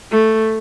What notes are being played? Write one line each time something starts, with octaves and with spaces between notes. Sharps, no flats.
A3